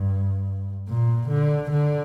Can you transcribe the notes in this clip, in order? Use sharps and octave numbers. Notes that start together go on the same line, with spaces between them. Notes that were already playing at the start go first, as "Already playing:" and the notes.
Already playing: G2
A#2
D3
D3